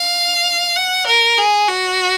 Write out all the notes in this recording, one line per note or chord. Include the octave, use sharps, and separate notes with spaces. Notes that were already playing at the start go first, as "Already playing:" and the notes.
Already playing: F5
F#5
A#4
G#4
F#4